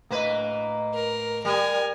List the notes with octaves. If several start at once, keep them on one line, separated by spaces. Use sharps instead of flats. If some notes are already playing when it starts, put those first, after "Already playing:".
A2 A#3 B4 D#5
A#4
G3 A#4 G#5